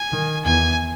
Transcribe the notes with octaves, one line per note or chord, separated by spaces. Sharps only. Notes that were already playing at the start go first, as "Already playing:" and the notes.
Already playing: G#5
D#3
E2 G#5